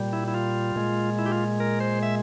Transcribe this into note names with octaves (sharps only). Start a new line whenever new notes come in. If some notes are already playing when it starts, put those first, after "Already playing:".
Already playing: A#2 G3
E4
E4
F4
A#2 G#3
E4
G4
F4
A#4
C5
E5